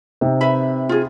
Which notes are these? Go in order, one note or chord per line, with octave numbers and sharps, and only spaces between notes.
C3 C4 D#4
B4 E5 B5
F4 G#4